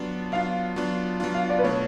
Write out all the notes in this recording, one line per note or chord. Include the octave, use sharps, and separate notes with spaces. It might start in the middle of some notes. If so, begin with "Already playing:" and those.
Already playing: F#3 B3 D4 F4
F#3 B3 D4 F4 F5
F#3 B3 D4 F4
F#3 B3 D4 F4
F5
D5
B4
B2 A3 D4 C#5